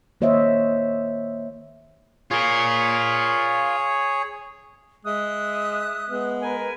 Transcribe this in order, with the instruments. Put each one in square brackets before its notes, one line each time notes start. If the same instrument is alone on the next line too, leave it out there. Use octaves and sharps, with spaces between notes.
[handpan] D#3 A#3 C5 C#5 D#5 E5
[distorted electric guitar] F4 A#4 [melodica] G#4 C#5
[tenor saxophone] G#3 [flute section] E5 D#6 F#6
[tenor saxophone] G#3 [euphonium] B3
[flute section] A#4 B4 G#5